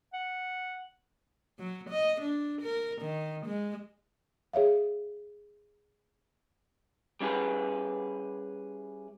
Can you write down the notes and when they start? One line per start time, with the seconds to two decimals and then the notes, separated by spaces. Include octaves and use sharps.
0.13 F#5
1.59 F#3
1.90 D#5
2.21 D4
2.62 A#4
3.02 D#3
3.46 G#3
4.53 G#4 C#5 E5 F5
7.21 G3 C#4 E4 G#4 B4